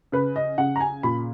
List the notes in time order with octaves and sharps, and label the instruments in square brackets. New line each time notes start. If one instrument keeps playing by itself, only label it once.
[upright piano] C#3 B4
D#5
C#3 F#5
A#5
G#5
A#2 B5